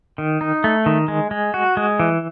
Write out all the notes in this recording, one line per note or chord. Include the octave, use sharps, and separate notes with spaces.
D#3
D#4
A3
D#3
G#3
G#3
F#4
G#3
E3